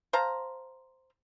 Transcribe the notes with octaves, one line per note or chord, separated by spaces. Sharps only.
C5 F5 A5 A#5